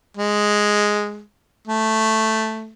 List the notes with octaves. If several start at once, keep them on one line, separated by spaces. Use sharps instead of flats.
G#3
A3